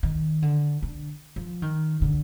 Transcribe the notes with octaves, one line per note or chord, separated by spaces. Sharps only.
D#3
D3
D3
F3
D#3
D3